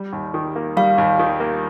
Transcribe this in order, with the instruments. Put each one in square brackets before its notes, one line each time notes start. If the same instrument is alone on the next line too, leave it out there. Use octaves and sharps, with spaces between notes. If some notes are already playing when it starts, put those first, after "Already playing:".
Already playing: [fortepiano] G3
D#2
D#3
A#3
[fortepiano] G3 [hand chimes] F5
[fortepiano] D#2
D#3
A#3